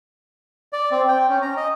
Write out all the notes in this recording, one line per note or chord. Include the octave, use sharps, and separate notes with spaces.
D5
C4
G5
C#4
A#5
D#5